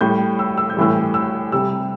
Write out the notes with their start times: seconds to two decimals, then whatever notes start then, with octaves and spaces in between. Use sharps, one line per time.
0.01 A2 G3 G6
0.39 E6
0.58 E6
0.70 G6
0.77 A2 E3 G3 E6
1.14 E6
1.52 C3 G3 E6